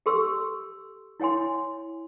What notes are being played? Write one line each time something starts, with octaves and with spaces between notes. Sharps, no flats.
G4 A4 C6 C#6 E6
E4 C#5 F#5 G#5 C6